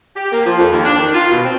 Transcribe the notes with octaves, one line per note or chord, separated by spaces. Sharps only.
G4
A#3
F3
F2
D#2
D4
D#3
F4
B2
C4